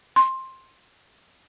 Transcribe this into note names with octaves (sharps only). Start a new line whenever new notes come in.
C6